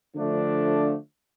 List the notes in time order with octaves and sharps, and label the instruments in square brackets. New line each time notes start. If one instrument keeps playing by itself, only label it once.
[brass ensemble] D3 F3 A3 D4